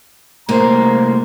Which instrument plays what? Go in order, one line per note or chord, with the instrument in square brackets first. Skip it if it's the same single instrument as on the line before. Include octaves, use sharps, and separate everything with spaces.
[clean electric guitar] C2 A2 C5 [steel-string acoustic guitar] A#3 [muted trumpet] A#5